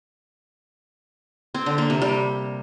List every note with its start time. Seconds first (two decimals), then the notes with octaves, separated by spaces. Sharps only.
1.55 C4
1.66 D3
1.78 A#3
1.90 C3
2.02 G3